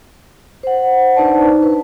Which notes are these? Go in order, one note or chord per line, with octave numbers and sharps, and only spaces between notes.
C5 F#5
D4 D#4 B4 C5 D5 A5
B4